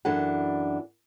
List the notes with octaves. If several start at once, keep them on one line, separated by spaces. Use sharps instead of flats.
F#2 E3 D4 A4 B4 F#5